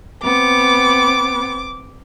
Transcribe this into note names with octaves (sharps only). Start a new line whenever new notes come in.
B3 C4 D6